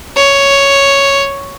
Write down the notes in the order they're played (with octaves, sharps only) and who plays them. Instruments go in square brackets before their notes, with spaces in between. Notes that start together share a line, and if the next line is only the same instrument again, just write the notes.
[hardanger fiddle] C#5